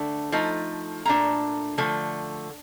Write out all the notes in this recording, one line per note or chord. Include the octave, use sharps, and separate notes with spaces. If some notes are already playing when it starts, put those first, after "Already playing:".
Already playing: D3 A3 D4
F3 A3 D#4
A#2 A3 D4 A#5
D3 F3 A3